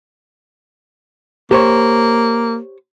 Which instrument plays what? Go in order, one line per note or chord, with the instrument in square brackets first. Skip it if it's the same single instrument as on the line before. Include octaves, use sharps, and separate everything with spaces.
[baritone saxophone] A#3 [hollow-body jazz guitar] G4 C5 C#5